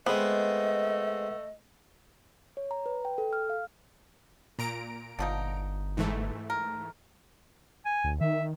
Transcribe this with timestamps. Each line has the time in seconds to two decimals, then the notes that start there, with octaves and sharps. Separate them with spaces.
0.06 G#3 A3 B3 C4 D#5
2.57 C#5
2.71 A#5
2.86 B4
3.05 G5
3.18 A4
3.33 F6
3.50 F5
4.59 A#2 A#5 D7
5.19 G1 D3 F3 D#4
5.97 G#2 E3 A3
6.50 A#4
7.85 G#5
8.04 D2
8.21 D#3 E5